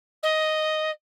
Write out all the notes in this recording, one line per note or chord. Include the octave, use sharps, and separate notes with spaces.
D#5